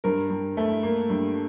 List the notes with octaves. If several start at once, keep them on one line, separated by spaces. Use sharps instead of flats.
G2 A#4
G2
A3
A#3
G2